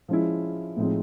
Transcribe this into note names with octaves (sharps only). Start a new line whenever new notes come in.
F3 G#3 C#4 E4
A2 F3 G#3 C4 D#4